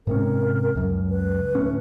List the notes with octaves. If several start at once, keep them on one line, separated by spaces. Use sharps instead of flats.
G#2 C3 C#4 A#4
C#2 F#2
B4
D1 A2 C#4